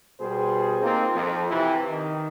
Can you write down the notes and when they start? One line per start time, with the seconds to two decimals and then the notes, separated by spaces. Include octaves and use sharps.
0.20 B2 G3 G#4 C5
0.82 A#3 C4 D#4 F4
1.13 F2
1.50 C3 E3
1.89 D#3